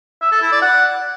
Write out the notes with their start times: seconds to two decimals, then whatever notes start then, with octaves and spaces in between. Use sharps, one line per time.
0.22 E5
0.32 A4
0.42 E4
0.52 D5
0.62 F#5